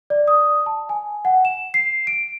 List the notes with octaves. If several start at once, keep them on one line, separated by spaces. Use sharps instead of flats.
D5
D#6
A5
G#5
F#5
E7
C7
D7